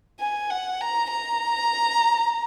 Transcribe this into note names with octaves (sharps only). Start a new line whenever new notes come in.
G#5
F#5
A#5
A#5